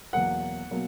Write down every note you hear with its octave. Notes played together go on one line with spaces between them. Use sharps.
E2 B2 F#3 A#3 F#5
B2 F#3 A#3